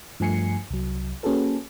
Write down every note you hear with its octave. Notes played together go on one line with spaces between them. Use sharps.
G2 F3 A3 G#5 C7 C#7
C2 F#3
A#3 C#4 F#4 G#4 A4 B4